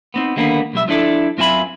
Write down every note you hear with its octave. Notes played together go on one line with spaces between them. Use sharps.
B3 C4 D#4
D3 D#3 G3 A#3 B3 D4
B1 G3 E5
F3 D4 E4 A4 D5
F#2 C4 F4 E5 G#5 B5